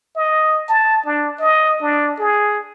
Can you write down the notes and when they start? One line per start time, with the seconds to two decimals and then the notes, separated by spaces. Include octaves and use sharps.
0.16 D#5
0.69 A5
1.06 D4
1.40 D#5
1.81 D4
2.18 G#4